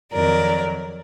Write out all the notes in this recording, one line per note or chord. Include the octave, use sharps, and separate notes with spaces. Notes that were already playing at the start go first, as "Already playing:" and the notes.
F2 D#3 F#3 A#4 D5